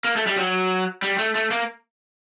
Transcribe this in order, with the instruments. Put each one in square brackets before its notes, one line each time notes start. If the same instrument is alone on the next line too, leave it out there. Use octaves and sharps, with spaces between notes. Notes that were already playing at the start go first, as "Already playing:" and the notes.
[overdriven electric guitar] A#3
A3
G3
F#3
G3
A3
A3
A#3